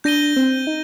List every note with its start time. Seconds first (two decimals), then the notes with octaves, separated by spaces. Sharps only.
0.04 D4 G6 A#6 D#7 G7
0.36 C4
0.67 D#4